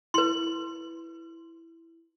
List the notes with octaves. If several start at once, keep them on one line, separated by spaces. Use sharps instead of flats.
E4 B4 C6 F#7